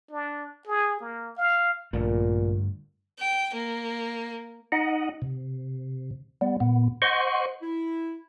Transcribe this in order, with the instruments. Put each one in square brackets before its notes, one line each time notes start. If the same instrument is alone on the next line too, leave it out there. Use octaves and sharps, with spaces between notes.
[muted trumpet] D4
G#4
A#3
F5
[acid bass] A#1 [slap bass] G2 D3 A3 [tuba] A#2
[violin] G5
A#3
[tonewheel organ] D#4 D#5 F#5
C3
G3 B3
A#2 B3
C5 D#5 F#5 C6 C#6
[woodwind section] E4